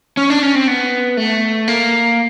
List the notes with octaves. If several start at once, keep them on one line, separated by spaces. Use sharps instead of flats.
C#4
D4
C#4
C4
B3
A3
A#3